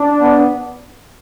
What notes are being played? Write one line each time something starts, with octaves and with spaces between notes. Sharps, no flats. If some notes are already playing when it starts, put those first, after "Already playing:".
Already playing: D4
B3